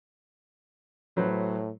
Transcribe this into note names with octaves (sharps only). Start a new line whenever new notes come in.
A2 F#3 B4 C5